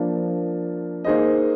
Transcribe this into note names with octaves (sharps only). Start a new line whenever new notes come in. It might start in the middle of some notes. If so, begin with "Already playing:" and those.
Already playing: F3 A#3 D4
A#3 D#4 G#4 C5 D#5